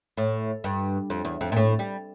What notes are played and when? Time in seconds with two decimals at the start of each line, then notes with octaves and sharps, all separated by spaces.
0.17 A2
0.64 G2
1.10 F2
1.25 E2
1.41 F2
1.52 A#2
1.57 A2
1.79 G3